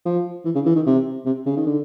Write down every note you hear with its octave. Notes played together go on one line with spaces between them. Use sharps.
F3
E3
C#3
E3
D#3
C3
C3
C#3
D#3
D3